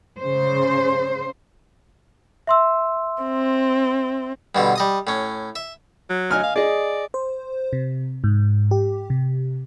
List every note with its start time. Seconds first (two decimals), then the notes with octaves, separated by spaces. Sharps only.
0.20 C#3 C5
2.47 E5 C6 E6
3.24 C4
4.55 G2 B2 D3
4.76 G3 D#5 D#6
5.07 A2 C#4
5.56 E5
6.10 F#3
6.31 D#5 G#5 F6
6.43 F5
6.56 G#4 D5 D#5
7.14 C5
7.73 C3
8.24 G#2
8.71 G4
9.10 C3